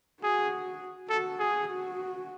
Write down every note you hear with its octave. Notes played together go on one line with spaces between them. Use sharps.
F#4 G#4
F#4 A4
G#4
F#4